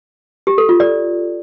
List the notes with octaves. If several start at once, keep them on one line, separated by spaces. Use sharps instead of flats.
G4
A4
F4
D5